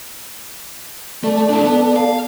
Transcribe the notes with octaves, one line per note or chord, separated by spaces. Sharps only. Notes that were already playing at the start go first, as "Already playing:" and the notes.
A3 A4 D5 A5
D4 E4
B3
F5